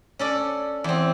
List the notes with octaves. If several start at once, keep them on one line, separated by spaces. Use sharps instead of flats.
C#4 A4 D5
E2 C4